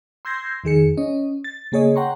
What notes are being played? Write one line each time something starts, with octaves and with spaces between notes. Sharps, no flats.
C6 E6 G6 G#6 A#6 C7
F2 D#3 G#4 C#7
C#4 D#5
A6
C#3 A#3 G#4 C#5 D#5
C#5 F#5 G5 A#5 C6 C#6